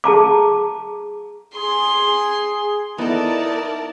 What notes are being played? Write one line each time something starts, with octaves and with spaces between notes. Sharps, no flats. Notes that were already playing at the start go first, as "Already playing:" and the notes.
G#4 A5 A#5 D6
G#4 C6
B3 D#4 E4 A4 A#4 D5 A5